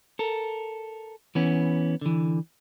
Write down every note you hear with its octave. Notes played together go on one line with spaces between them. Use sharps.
A4 A#4
E3 B3 C#4
D3 E3